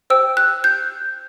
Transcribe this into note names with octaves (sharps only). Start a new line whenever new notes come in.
C5 G5 E6
F#6
G6